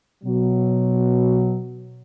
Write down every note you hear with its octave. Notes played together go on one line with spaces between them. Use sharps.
B2 F#3